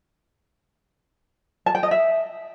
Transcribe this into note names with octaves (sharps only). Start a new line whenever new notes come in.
A5
G5
D#5
E5